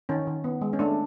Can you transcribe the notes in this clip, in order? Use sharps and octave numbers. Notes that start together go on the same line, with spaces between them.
D#3 C#4
D#3
B3
G#3
C#4
A3 D4